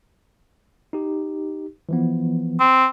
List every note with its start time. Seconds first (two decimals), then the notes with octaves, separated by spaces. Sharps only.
0.93 D#4 G4
1.89 E3 F3 B3
2.60 C4